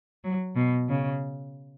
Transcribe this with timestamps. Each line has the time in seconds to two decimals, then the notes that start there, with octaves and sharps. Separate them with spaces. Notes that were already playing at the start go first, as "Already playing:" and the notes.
0.24 F#3
0.56 B2
0.89 C#3